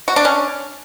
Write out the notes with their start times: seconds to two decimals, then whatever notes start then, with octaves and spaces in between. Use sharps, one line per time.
0.08 F#4
0.16 D4
0.25 C#4